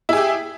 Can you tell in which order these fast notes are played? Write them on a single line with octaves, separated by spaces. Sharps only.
E4 G#4 G4